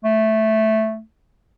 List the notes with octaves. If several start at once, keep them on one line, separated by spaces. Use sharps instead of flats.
A3